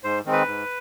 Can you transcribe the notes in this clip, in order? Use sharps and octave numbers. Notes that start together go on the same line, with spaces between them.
G#2 C5
D#3 G#3 C4 D#4
B4
G#2